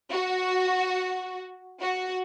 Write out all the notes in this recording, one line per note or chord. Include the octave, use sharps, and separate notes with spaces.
F#4
F#4